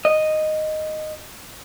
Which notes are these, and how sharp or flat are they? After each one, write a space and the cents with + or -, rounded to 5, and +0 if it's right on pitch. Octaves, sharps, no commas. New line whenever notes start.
D#5 -5